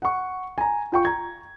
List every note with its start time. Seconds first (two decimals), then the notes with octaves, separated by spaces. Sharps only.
0.02 F#5 C#6
0.58 G#5 A#5
0.92 F4 G5 C#6
1.05 A#5 G#6